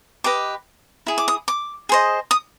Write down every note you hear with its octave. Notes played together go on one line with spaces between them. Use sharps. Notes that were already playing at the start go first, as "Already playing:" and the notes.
G4 B4 D#5 D6
E4 G#4
D6
D#6
D6
G#4 C5 D#5
D#6